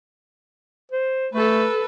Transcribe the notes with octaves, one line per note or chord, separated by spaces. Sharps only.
C5
A3 A4 B4